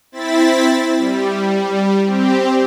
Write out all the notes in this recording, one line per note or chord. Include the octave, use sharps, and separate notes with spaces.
C4 E4 A6 B6
G3
C4 G4